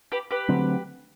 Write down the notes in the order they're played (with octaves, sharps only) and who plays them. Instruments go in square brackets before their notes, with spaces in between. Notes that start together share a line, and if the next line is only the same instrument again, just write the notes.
[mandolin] G4 B4
G4 B4
[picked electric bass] D3 F#3 A3 C4